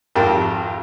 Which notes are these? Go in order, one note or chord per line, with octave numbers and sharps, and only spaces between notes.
G#1 F2 G4 A#4